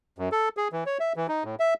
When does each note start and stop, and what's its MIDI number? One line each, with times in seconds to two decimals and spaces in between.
0.19 0.29 42
0.32 0.49 69
0.57 0.68 68
0.72 0.84 52
0.86 0.98 73
1.00 1.13 76
1.16 1.27 52
1.28 1.44 63
1.44 1.55 45
1.60 1.74 76